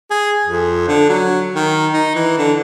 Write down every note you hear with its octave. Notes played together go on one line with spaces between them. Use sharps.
G#4
F2
D3
F#3
D#3
D#4
E3
D3